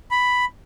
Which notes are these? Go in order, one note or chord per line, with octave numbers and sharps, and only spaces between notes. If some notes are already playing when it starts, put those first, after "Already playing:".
B5